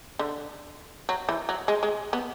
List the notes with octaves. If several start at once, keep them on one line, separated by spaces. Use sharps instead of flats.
D3
F#3
E3
F#3
G#3
G#3
B3